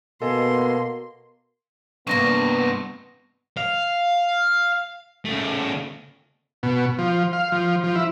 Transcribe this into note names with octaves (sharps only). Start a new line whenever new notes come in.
B2 A#3 A4 D#5 G#5 C6
G2 C3 A#3 B3 D4 C#6 A#6
F5
C#3 A3
B2
F3
F5
F3
F3
E4